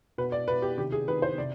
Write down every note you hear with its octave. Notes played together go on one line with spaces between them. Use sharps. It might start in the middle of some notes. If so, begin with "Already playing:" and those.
B2 B4
D5
B2 B4
G4
C3 D#3 G4
G#4
C3 D#3 B4
C5
C3 D5